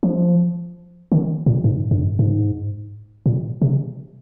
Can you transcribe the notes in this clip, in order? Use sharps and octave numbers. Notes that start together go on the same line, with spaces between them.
F3
D#3
A#2
G#2
G2
G#2
A#2
C3